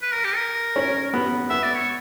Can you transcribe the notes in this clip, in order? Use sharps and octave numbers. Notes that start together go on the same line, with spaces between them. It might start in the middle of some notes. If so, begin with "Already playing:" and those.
B4
A#4
G4
A#4
C#4
B3
B3 E5
D5
C#5